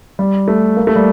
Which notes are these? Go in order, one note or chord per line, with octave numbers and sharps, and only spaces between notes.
G3
A3
A#3
A3
G3